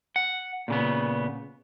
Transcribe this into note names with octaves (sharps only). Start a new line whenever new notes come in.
F#5
A#2 C#3 B3